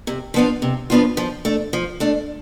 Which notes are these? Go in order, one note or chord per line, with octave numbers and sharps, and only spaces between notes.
C3
F3 B3 D4 F4
C3
F3 B3 D4 F4
F3
A3 D4
F3
A3 D4